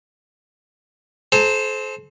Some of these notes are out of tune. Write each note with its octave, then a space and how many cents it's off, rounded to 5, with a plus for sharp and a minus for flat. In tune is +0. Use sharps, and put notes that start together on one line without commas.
A4 -40 C5 +0 A#5 -40